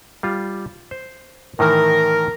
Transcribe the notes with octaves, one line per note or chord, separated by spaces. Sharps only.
G3 F4
C5
A2 D#3 E3 A#4